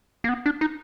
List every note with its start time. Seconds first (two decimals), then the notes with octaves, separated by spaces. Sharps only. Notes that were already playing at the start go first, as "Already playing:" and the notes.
0.24 A#3
0.29 B3
0.46 D4
0.61 D#4